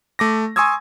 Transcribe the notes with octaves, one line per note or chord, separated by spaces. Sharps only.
A3 D6 A#6
G#5 C6 C#6 D#6 E6 G#6